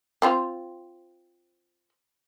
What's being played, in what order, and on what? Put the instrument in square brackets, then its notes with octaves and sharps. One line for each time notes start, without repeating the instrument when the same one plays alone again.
[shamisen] C4 F4 C5